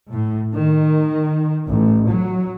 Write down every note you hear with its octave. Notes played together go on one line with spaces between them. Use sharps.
A2
D#3
A1
F#3